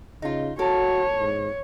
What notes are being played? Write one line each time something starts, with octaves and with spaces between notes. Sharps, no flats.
C#3 D#4 F4
F#4 A4 A#4 C#5
G#2